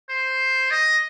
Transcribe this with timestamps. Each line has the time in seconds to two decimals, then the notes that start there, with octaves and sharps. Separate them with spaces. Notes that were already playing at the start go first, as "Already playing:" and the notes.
0.10 C5
0.71 D#5